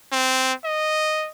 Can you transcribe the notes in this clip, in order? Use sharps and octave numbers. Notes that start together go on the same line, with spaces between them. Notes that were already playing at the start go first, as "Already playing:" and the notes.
C4
D#5